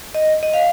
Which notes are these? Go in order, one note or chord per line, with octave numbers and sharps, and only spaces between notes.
D#5
D#5
F5